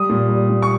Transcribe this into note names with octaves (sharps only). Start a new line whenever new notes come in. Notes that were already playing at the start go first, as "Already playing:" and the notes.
Already playing: G3 D#6
A#2
G3
A#2
C#6